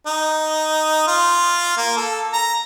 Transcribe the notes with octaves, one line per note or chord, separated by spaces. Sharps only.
D#4
F4
A#3
A4
A#5